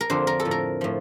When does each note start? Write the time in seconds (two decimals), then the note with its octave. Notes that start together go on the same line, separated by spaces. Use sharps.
0.01 A#4
0.10 F2 D3 F3 C5
0.27 A#4
0.40 A4
0.45 A2 F3
0.51 A#4
0.81 A2 F3